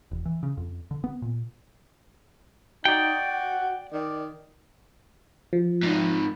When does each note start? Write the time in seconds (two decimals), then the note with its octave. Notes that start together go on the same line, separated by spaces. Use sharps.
0.11 E1
0.25 E3
0.43 C#3
0.57 F2
0.91 D3
1.04 B3
1.22 A#2
2.85 D#4 F#4 D5 G5
3.28 F#5
3.92 D#3 D5
5.53 F3
5.83 G#2 D#3